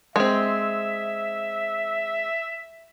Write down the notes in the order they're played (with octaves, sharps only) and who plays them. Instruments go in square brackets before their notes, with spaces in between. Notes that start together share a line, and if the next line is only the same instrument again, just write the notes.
[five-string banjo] G#3 C4 [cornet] E5